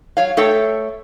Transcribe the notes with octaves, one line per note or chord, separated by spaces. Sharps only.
F#3 C#5 F5
A3 A4 C#5 E5 G5